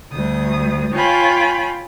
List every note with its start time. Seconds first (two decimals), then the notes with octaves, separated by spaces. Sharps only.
0.12 D2 G3 D#6
0.93 F4 C#5 G5 G#5 B5